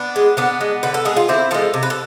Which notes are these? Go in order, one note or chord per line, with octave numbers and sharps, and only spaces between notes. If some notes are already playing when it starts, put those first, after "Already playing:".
Already playing: B3 D4
G#3
D3 B3 D4
G#3
D3 B4
A4
G#3 G#4
F4
D3 C4 E4
F3 G#3 F4 A4
C3
B4
A4